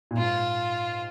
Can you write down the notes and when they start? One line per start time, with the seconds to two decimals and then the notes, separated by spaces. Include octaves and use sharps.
0.11 A#2
0.17 G#2 F4